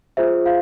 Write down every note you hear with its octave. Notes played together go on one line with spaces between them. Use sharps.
F4 G#4 C5 E5
F4 F5